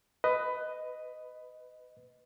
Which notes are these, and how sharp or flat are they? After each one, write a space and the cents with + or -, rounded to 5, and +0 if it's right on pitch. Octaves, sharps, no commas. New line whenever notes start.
B4 +15 D#5 +0